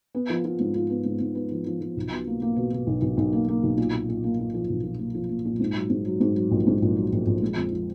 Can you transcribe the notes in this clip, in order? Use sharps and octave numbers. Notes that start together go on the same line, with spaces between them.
B3
F3
F4
G#2
F4
B3
G#2
G#2
B3
F3
F3
F3
B1
B2
A#3
A#3
B2
B2
B1
B1
B1
A#3
A#3
B1
A#2
A#2
A#2
A#3
A#2
F3
B1
F3
A#3
F3
A#3
A#2
G#2
F#3
G#2
F#3
G#2
F#3
A#1
G#2
A#1
F#3
A#1
A#1
G#3
F2
F3